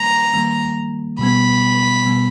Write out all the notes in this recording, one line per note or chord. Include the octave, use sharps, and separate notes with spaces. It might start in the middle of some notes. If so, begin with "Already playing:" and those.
Already playing: D#3 G3 A#3 A#5
D#3 G3 A#3
B2 G3 B3 B5
B2 G3 B3